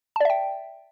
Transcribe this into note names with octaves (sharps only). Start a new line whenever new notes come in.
D5 E5 G5 A5